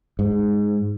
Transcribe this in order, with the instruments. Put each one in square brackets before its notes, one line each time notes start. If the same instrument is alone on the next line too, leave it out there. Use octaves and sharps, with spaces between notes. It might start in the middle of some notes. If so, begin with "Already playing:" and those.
[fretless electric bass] G#2